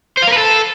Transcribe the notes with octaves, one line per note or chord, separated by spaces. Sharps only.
C5
F5
A#4
B4
A4